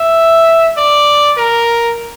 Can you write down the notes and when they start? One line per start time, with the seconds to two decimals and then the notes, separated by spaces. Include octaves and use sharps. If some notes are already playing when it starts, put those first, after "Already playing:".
Already playing: E5
0.77 D5
1.37 A#4